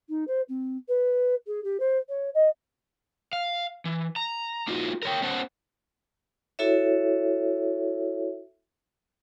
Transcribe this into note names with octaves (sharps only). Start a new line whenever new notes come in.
D#4
C5
C4
B4
G#4
G4
C5
C#5
D#5
F5
E3
A#5
A#3 D#4 F4 F#4
A#4 C#5 G5
B3 C#4 C5 F#5 A5
E4 F#4 A4 C#5 E5